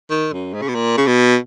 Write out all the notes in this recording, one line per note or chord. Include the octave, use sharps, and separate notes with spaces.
D#3
F#2
G#2
C#3
B2
A#2
C#3
B2